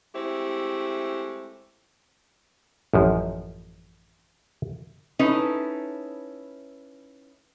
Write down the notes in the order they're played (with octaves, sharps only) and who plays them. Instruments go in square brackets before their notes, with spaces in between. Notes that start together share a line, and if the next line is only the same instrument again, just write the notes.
[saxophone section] G#3 A3 C4 E4 G4
[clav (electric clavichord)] A1 F#2 F3
[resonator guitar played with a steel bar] C#4 D#4 E4 A4 B4